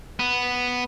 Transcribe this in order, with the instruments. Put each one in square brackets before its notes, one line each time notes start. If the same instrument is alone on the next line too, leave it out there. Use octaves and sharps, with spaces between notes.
[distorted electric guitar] B3